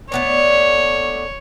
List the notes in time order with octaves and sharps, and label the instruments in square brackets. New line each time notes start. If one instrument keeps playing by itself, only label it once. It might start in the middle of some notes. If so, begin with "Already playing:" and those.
[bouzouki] A3 B3 D4 [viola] C#5